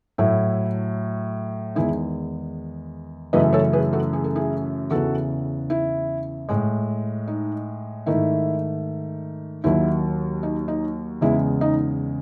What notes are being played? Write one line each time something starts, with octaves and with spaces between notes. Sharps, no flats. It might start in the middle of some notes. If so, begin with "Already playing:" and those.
A2 F#3 A3 E4
E2 D#3 G#3 E4 G#4
F#2 C#3 E3 A3 B4 D#5
A4 C#5
G#4 B4
F#4 A4
G#4
A4
E4 G#4
E2 C#3 E3 F#4 A4
E4
A2 G#3
D#4
G#2 D#3 A3 E4
D#2 D#3 F#3 E4
D#4
D#4
E2 C#3 G#3 E4
D#4